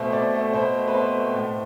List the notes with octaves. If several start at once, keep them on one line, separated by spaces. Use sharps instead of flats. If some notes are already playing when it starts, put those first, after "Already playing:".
Already playing: B2 A3 C4 C5
B2 D5
A3 C4
B2 C5
A3 C4
B4
B2 C5
A3 C4
A2